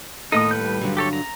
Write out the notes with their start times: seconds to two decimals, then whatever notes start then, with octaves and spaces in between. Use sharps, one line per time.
0.32 D#2 A2 D#4 A4 D#5 D#6
0.51 G3 B4 G6
0.81 G2 D3 F#3
0.97 G4 A4 C#5
1.13 A#5